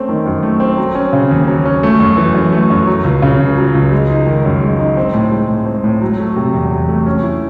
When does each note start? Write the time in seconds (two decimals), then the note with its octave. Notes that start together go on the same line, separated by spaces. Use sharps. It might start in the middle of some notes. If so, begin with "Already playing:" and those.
Already playing: A3 C4 C#4
0.09 D#3
0.26 F#2
0.43 A3
0.60 C4
0.77 F#3
0.95 C#4
1.13 C#3
1.31 D#2
1.47 F#3
1.65 C#4
1.83 A3
2.00 F#2
2.17 E3
2.34 F#2
2.52 A3
2.70 F#2
2.87 F#3
3.04 C#2
3.22 C#3
3.39 C#2
3.57 F#3
3.75 C#2
3.92 G#3
4.10 D#4
4.26 D#3
4.45 F#2
4.62 G#3
4.79 D#4
4.97 C4
5.14 A2
5.31 G#3
5.49 A2
5.66 C4
5.84 A2
6.01 F#3
6.19 A3
6.36 C3
6.53 E2
6.71 F#3
6.89 A3
7.06 C#4
7.23 E4